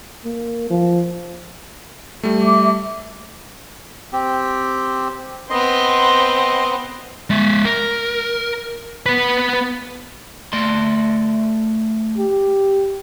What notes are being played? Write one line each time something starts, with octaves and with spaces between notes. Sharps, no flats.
A#3
F3
G3 A3
E5 D6
C4 G4
B3 C4 D#5 C6
G#3 E5
A#4
B3 B4
A3 D5 C6
G4